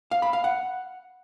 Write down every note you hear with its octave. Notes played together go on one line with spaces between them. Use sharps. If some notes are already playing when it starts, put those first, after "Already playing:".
F5
B5
F5
F#5